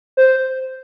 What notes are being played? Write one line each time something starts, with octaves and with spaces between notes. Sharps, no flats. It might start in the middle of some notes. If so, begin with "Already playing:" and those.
C5